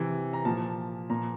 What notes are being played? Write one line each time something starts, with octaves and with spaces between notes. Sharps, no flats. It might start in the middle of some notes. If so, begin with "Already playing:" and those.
Already playing: C3 E3
A#5
A#2 F3 A5
A#2 F3 A#5